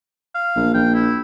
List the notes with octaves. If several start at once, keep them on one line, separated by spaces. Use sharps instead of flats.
F5
A#1
A#1 G5
E4